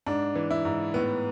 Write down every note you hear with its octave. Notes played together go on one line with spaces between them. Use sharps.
G#2 D4
E3
E4
G#2
A2 B3